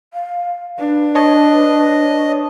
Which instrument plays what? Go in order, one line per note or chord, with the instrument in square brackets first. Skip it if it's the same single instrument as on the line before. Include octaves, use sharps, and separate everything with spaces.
[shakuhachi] F5
[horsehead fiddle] D4 [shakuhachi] B4
[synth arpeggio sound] C#5 A5 [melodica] D#5